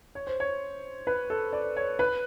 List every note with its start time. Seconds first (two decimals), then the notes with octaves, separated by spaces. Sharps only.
0.15 C#5
0.27 C5
0.40 C#5
1.07 B4
1.30 A4
1.53 D5
1.76 C#5
1.99 B4